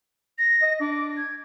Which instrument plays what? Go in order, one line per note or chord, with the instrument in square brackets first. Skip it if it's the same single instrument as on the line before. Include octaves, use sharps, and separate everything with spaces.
[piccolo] A#6
[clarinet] D#5
[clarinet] D4 [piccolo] D6
[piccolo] G#6